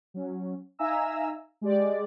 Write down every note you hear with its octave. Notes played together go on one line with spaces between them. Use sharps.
F#3 C#4
D#4 E5 F5 G#5 A#5 E6
G#3 G4 D5